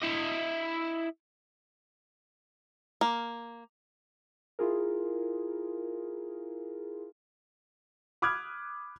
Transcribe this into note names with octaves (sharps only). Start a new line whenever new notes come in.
E4 D#5
A#3
E4 F4 G#4 A#4
B5 D6 D#6 F6 F#6 G#6